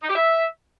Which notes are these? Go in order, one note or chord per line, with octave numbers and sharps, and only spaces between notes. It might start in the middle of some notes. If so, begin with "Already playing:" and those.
D#4
G4
E5